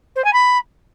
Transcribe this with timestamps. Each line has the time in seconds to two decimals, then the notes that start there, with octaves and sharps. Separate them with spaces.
0.15 C5
0.24 G#5
0.33 B5